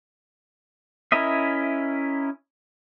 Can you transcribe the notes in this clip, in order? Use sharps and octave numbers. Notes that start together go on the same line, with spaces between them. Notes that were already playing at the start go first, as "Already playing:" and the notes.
C#4 E4 A#4 D#5 E5